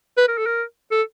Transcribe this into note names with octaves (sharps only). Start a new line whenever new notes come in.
B4
A#4
A4
A#4
A4